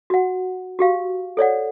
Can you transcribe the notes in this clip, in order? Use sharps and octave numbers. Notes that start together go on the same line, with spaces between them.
F#4 F#5
F#4 G4 F5
A4 C#5 D5 F#5